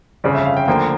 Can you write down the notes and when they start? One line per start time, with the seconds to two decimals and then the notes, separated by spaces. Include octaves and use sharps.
0.24 G1 F2 C#3 D5
0.35 E5
0.46 F5
0.57 G5
0.68 D2 D3 F3 A#3 G5